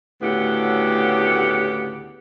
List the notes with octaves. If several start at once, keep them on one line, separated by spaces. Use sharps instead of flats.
D2 A2 C#3 B3 G4 F#5